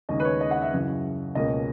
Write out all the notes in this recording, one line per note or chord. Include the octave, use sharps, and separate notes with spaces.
D#2 C#3 G#3 C#4 D#5
B4
C#5
D#5
F#5
E5
F#2 C#3 E3
C#2 B2 A#3 C#4 D#5